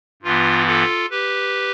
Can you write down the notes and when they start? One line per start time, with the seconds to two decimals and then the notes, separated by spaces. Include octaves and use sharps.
0.22 G2 E3 B3 F4
0.66 F4 A4
1.10 G4 B4